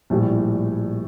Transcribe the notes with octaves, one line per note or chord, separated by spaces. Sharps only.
A#1 A2 G3